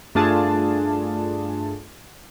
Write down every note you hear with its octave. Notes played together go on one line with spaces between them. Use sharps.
G2 A3 D4 F4 G#4 A5